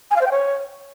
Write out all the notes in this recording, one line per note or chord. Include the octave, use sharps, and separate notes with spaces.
G#5
F5
C5
G5
C#5